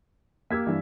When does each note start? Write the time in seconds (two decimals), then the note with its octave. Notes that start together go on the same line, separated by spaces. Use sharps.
0.50 A#3 G4 E6 G#6 B6
0.66 G2 E3